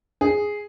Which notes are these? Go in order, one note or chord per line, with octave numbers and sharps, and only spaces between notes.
G#4